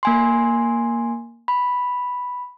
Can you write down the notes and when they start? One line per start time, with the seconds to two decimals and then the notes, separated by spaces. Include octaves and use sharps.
0.03 A#3 G#5 C6
1.48 B5